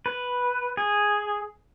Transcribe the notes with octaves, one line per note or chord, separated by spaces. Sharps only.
B4
G#4